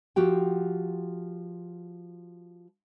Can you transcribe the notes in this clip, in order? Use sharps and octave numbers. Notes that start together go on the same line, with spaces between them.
F3 F#4 G4 G5